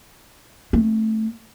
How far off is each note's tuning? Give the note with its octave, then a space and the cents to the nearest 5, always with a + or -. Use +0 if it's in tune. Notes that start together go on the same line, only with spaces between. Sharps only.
A3 +0 C4 +35